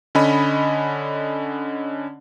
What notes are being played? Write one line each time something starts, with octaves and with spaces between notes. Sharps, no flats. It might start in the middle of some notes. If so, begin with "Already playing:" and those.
D3 C#4 D#5 B5